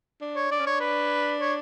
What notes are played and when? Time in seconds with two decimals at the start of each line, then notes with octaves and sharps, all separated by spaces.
0.21 D4
0.36 C#5
0.51 D4 D5
0.60 C#4
0.66 D4 C#5
0.80 B4
1.40 C#5